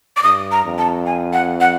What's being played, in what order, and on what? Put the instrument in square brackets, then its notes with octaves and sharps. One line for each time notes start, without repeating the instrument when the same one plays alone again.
[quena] D6
[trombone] G2 [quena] D#6
[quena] A#5
[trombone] F2
[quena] A5
G#5
F#5
F#5